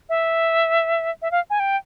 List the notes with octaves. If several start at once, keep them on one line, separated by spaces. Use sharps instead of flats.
E5
E5
F5
G#5
G5